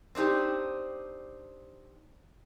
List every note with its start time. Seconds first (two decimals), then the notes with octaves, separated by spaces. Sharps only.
0.15 C4 D4 D#4 G4